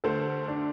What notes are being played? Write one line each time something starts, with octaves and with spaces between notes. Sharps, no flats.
D2 D3 A3 A4 C5
D4